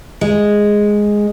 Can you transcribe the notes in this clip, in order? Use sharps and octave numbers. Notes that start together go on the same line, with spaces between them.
G#3